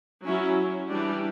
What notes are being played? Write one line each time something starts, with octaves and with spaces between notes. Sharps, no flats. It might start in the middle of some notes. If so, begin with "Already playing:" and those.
F#3 C#4 E4
E3 G3 D4 G4